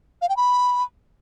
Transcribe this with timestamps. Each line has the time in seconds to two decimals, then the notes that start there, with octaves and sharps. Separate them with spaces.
0.22 F5
0.29 G5
0.37 B5